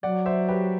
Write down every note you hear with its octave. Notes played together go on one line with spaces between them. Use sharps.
F#3 D5 F#5
C5 E5
G4 B4